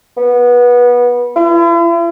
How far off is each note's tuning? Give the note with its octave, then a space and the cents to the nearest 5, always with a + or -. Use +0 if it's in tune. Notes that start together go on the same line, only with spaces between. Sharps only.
B3 -20
E4 +45